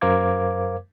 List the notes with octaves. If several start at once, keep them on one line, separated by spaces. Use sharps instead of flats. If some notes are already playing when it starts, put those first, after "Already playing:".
F#2 A#4 C5 F5 D6 G#6